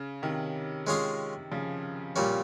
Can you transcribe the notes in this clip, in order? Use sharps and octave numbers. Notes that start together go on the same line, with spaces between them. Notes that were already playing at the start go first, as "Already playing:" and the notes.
Already playing: C#3
C3 D#3
G#3 C#4 F4 G#4
C#3 F3
A#2 G3 C#4